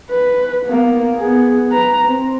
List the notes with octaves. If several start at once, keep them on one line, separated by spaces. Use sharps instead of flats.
B4
A#3 B3
B3 G#4
B4 A#5
C4